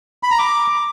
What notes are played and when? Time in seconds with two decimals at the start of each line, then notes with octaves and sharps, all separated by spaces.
0.23 B5
0.31 A#5
0.39 D6